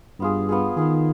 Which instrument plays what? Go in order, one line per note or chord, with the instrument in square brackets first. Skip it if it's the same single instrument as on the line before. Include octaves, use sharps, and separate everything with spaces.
[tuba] G2 [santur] B3 F4 G#4
[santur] B3 F4 G#4
[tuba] D#3 [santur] B3 F4 G#4